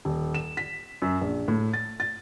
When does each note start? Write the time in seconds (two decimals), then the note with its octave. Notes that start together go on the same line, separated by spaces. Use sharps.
0.05 D#1
0.34 E7
0.57 B6
1.02 F#2
1.21 A#1
1.48 A2
1.73 A6
2.00 A6